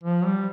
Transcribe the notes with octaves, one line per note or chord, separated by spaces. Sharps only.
F3
G3